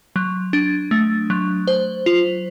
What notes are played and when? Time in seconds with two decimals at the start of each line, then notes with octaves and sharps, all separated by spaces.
0.16 F#3
0.53 D4
0.91 A3
1.30 F#3
1.67 C5
2.06 F4